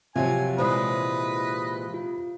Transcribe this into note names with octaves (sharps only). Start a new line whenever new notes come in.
C3 F3 F#3 F4 G#5
A#2 E3 G#3 B4 C5 D#5
F4